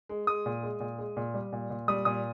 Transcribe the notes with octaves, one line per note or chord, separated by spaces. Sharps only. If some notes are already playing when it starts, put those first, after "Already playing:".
G#3
G#3 D#6
A#2
G#3
A#2
G#3
A#2
G3
A#2
A#2
G3 D#6
A#2 D#6